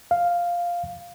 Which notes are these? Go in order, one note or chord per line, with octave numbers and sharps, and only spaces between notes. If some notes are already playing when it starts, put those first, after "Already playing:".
F5